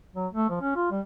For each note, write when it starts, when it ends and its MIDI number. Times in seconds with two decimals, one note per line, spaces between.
0.16 0.27 54
0.33 0.49 57
0.50 0.59 53
0.61 0.73 61
0.76 0.91 65
0.92 1.00 55